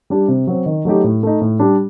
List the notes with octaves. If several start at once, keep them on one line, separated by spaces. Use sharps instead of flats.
G3 D4 G4
C3
F#3 C4
D#3
F#3 A3 D#4 G4
A2
A3 D#4
A2
G3 D4 G4